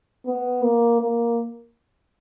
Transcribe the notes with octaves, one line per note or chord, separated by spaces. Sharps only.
B3
A#3
A#3